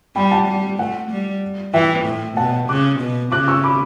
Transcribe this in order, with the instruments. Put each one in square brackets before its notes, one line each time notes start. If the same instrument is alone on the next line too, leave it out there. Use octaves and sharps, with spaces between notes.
[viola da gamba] G3 [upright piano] G5 B5
[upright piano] F#5 A5
[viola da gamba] G3
[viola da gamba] A3 [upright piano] F#5
[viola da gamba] G3
[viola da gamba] E3 [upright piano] E5 G5
[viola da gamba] A2
[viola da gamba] B2 [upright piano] F#5 A5
[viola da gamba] C#3 [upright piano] D6 F#6
[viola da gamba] B2
[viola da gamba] C#3 [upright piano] D6 F#6
[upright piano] C#6 E6
B5 D6